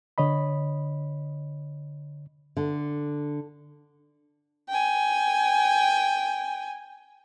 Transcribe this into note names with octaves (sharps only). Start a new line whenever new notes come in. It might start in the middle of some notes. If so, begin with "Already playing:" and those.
D3 C#5 D#5 B5
D3
G5 G#5